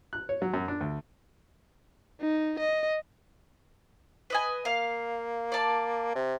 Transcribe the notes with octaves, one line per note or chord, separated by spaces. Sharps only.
F#6
C#5
F#3
F#2
D4
D2
D#4
D#5
B4 D#5 G#5
A#3 F5
D5 A5
C3